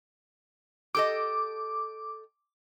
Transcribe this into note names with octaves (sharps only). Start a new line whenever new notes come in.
G4 A4 D#5 D6